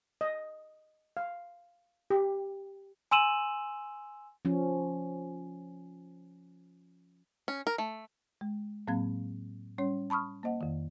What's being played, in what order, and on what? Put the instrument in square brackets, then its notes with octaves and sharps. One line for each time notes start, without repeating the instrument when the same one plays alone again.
[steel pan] D#5
F5
G4
[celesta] G#5 C6 E6 D#7 E7 F#7
[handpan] F3 C#4
[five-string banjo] C#4
A#4
A3
[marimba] G#3
A2 F#3 A#3 C4 F5 G#6
G3 C#4 C#5
A5 B5 C#6 D#6 F6
A#3 C5 D#5 F#5
F2 D#3